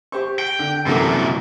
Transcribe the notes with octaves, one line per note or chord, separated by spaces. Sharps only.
G4 C5 C#6
G5
D3
F#2 C3 E3 A#3 A4